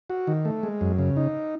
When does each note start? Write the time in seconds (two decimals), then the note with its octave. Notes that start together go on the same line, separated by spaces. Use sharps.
0.10 F#4
0.27 D#3
0.45 A3
0.63 G#3
0.81 F#2
0.99 C#3
1.17 D#4